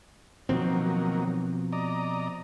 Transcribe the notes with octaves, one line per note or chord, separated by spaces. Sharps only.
B2 D#3 F3 F#3 A#3 C4
D5 D#5 A#5